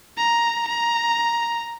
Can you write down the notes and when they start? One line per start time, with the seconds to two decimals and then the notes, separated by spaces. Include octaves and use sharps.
0.17 A#5
0.68 A#5